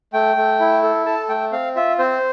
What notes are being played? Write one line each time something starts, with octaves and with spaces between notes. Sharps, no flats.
A3 G5
A3
E4
A4
A4 A5
A3 G5
C4 F5
F4 E5
C4 C5